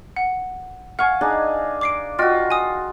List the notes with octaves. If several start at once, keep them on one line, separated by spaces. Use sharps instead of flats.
F#5
F5 F#5 G#5 C#6
D4 D#4 G#4
D6 C7 D7
F4 F#4 D#5 G5 F6
G#5 D#6